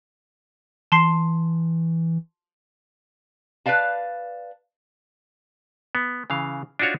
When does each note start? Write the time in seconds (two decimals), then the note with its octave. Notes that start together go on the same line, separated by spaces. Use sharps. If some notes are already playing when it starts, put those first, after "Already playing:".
0.92 E3 A5 C6 C7
3.66 B4 C5 D5 F5 A5
5.95 B3
6.30 C#3 E3 F5
6.79 D4 D#4 F4 F#4 C#5